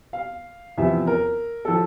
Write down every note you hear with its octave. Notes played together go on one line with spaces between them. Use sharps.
F5
E2 C3 F3 E5
A#4
F3 A4